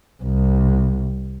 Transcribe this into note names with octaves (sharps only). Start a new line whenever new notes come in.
C2